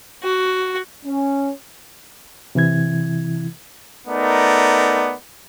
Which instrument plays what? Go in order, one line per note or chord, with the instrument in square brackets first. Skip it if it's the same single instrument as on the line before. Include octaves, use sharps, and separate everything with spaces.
[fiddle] F#4
[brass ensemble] C#4
[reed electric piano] C3 E3 E4 G#6
[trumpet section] A3 B3 D#4 A#4 D5